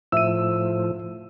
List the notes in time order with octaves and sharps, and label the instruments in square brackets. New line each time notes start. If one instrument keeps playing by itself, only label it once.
[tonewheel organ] A2 F3 [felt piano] E5 [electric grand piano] E6 D#7